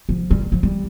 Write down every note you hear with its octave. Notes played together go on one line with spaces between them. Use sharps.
F3
G3
F3
G3